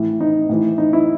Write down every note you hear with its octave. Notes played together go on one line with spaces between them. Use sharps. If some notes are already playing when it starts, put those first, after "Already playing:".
Already playing: A2 E3
D#4
A2 E3
D#4
E4